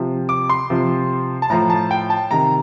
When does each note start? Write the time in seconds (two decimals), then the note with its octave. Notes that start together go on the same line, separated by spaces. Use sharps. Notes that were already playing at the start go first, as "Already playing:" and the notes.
Already playing: C3 F3
0.29 D6
0.50 C6
0.70 C3 F3
1.42 A5
1.50 A2 F3 A#5
1.70 A5
1.91 G5
2.10 A5
2.31 C3 D#3 A#5